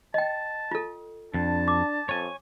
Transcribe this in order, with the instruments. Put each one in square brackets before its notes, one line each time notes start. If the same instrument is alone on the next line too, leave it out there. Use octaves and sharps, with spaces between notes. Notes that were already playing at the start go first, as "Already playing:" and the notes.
[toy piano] D#5 G5 [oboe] A5
[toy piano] F4 A4
[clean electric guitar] F2 [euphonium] D4 [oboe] A5
[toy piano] D6
[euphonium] F2 [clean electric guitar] C#5 G#5